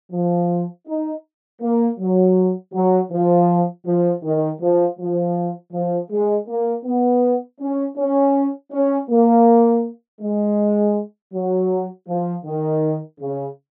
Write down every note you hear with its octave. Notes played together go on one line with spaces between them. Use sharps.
F3
D#4
A#3
F#3
F#3
F3
F3
D#3
F3
F3
F3
G#3
A#3
B3
C#4
C#4
C#4
A#3
G#3
F#3
F3
D#3
C#3